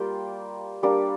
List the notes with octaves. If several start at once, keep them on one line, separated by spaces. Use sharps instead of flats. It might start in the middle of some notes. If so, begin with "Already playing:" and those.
Already playing: G3 A#3 F4 G5
G3 A#3 D4 D6